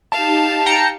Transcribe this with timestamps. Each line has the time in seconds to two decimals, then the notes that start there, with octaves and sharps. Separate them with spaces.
0.12 D#4 G4 F5 A5
0.66 G5 A#5 C#7